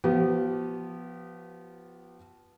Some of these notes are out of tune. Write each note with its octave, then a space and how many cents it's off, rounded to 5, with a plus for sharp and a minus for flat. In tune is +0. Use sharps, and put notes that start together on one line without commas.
F3 +0 B3 -10 G4 -40